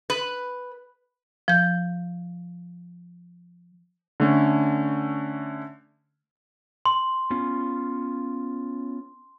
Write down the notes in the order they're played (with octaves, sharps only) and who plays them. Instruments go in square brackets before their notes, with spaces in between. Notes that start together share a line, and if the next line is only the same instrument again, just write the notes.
[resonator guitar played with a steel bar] B4
[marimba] F3 G6
[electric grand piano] D3 A3 C#4
[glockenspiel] C6
[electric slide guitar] B3 C#4 F4